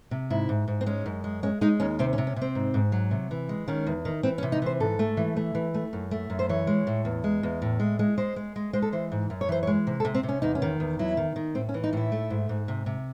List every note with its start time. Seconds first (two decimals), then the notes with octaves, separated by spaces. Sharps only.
0.11 C3
0.30 G#2 E4
0.49 G#2
0.68 G#2
0.81 C4
0.86 G#3 C#4
1.06 F#2
1.24 G#3
1.43 G#3 C#4
1.61 G#3 D#4
1.80 D#2 C#4
1.99 C3 C4
2.13 C#4
2.18 C3
2.27 C#4
2.36 C3
2.41 C4
2.55 G#2
2.74 G#2
2.92 F#3
3.11 C3
3.31 E3
3.49 G#3
3.68 D#3 C#4
3.87 E2
4.05 D#3
4.23 E3 C4
4.38 C#4
4.43 C3
4.52 D#4
4.62 E3 C5
4.80 G#2 A4
4.99 A3
5.17 E3
5.36 A3
5.55 E3
5.74 A3
5.93 F#2
6.11 A3
6.30 F#2
6.39 C5
6.49 E3 C#5
6.67 G#3
6.87 A2
7.05 E2
7.24 G#3
7.43 E2
7.62 A2
7.80 G#3
7.99 G#3
8.18 G#3 C5
8.36 G#3
8.56 G#3
8.73 G#3 C5
8.82 A4
8.92 E3 C5
9.12 G#2
9.30 F#2
9.41 C#5
9.49 E3 C5
9.63 C#5
9.67 G#3
9.87 C3
10.00 A4
10.05 C3
10.15 C4
10.23 C3
10.29 C#4
10.42 E2 D#4
10.55 C#4
10.62 D#3
10.80 E2
10.99 F#3 E4
11.17 D#3
11.36 D#3
11.55 A2 C4
11.69 C#4
11.74 E3
11.84 D#4
11.93 A2 E4
12.12 A3
12.30 G#2
12.49 G#2
12.68 C3
12.86 C3